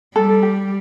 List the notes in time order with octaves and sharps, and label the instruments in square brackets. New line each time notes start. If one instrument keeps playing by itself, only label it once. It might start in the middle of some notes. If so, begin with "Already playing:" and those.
[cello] G3 [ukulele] A4
[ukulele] G4